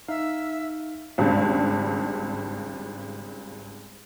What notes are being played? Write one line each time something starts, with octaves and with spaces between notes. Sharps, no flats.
D#4 E5 F5
G#1 C#2 G2